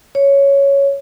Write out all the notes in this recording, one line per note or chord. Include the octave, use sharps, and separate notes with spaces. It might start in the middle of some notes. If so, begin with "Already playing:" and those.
C#5